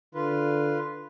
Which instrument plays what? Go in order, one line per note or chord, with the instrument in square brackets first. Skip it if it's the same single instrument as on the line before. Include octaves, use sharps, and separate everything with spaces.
[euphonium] D3 [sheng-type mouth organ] F4 B4